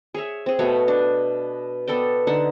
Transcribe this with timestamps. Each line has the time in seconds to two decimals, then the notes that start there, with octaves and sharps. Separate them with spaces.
0.14 G#4 C#5 E5
0.46 C4 G#4
0.59 B2 A3 B3 C#5
0.88 D4
1.87 B3 A4 D5 G5
2.27 D3 D#4 F#5 A5